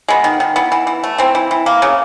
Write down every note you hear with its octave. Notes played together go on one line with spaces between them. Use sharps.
G#3 B3
D#3
D#3
E3 B3
E3
E3
A3
E3 C4
E3
E3
A#3
C#3